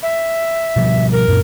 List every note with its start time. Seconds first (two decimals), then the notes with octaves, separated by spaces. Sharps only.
0.02 E5
0.76 B2 F3 G3
1.12 A#4
1.28 F#2 A#2